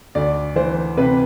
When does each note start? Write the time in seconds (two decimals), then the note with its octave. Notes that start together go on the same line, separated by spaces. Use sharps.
0.15 D2 D5
0.55 E3 C5
0.97 C3 B4